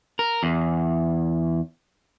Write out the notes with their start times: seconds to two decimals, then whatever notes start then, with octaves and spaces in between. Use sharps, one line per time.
0.19 A#4
0.43 E2